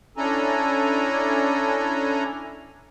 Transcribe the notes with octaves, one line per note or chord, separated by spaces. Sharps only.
C#4 D4 E4 A4 G#5 A#5